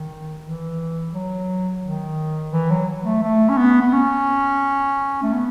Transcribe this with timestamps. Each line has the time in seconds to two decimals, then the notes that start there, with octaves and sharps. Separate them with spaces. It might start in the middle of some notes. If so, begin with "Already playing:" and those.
Already playing: D#3
0.43 E3
1.13 F#3
1.82 D#3
2.52 E3
2.71 F#3
3.05 A3
3.23 A3
3.49 C#4
3.57 B3
3.81 B3
3.93 C#4
5.23 A3
5.33 B3